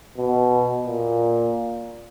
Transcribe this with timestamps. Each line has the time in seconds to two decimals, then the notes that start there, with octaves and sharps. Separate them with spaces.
0.18 B2
0.86 A#2